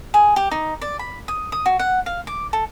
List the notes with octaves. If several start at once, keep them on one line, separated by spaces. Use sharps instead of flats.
G#4
G4
D#4
D5
B5
D#6
D#6
F#4
F#5
F5
D6
A4